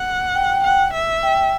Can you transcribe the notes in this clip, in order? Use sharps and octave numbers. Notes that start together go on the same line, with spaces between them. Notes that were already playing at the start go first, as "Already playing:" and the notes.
Already playing: F#5
G5
G5
F#5 G5
E5
G5
G5